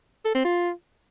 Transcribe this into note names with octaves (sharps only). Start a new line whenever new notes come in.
A4
C4
F4